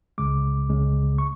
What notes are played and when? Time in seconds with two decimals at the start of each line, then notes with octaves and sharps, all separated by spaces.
0.18 C#2 C#3 G#3 D6
0.69 C#2 C#3 G#3
1.18 C#6